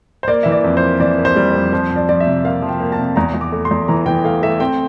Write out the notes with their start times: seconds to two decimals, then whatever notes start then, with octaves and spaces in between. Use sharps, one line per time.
0.23 C5
0.28 A#3 D5
0.43 E3 E5
0.52 D5
0.64 F2
0.77 C5
0.82 A#3
1.00 E3 D5
1.18 A#3
1.25 C5
1.36 G3
1.49 D5
1.55 F2
1.73 F3 C5
1.90 F3
1.96 D5
2.09 F3 D5
2.20 E5
2.27 C3
2.45 A#3 F5
2.62 F3
2.69 G5
2.80 A#3
2.92 A5
2.99 C3
3.16 E2 A#5
3.34 E2
3.41 D6
3.52 A3
3.65 C6
3.71 E2
3.88 E3 A#5
4.06 E3 G5
4.24 A3 F5
4.43 A3 E5
4.60 C4 G5